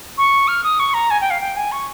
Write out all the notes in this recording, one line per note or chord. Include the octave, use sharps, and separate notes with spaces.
C#6
F6
D#6
C#6
A#5
G#5
G5
F5
G5
G#5
C#6